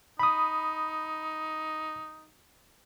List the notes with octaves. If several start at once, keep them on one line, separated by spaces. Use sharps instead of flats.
D#4 B5 D#6